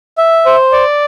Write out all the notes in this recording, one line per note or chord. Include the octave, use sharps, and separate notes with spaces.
E5
C5
D5